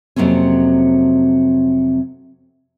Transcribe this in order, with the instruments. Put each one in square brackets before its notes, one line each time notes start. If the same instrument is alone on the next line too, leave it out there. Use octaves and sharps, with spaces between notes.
[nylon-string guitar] F2 C3 F#3 A#3 C4 C#4